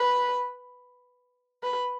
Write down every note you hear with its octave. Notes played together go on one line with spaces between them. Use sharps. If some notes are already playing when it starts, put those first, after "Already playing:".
Already playing: B4
B4